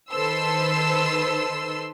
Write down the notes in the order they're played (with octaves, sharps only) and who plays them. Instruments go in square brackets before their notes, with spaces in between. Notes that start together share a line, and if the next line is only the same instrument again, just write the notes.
[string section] D#3 A4 B4 C5 C6 E6